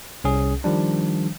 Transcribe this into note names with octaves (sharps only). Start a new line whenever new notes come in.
C2 C#4 G#4
D#3 F3 G3 D4